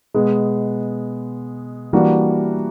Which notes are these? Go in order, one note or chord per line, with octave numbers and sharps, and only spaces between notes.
B2 G#3 B3
E3 G3 A#3 D4 F#4